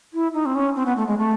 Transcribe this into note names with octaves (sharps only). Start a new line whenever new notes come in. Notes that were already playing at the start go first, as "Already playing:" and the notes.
E4
D#4
C4
C#4
C4
B3
A3
G#3
A3